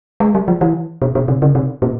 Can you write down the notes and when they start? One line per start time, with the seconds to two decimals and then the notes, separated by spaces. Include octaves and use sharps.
0.20 G#3
0.35 G3
0.48 F3
0.61 E3
1.02 B2
1.15 B2
1.28 C3
1.42 C#3
1.55 C3
1.82 A#2